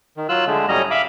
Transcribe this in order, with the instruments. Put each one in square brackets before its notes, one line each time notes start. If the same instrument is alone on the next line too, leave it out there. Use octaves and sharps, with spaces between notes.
[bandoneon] D#3
F#3 F4 E6 F#6
D3 G#3 A3
A2 F#3 G3 C#4 D#5 A#5
E5 F5 B5 D6